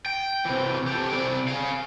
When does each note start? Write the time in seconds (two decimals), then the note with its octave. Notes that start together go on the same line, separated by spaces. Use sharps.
0.06 G5
0.45 C3 E3
0.87 G4 A4
1.10 C3 D5
1.48 G#4 F5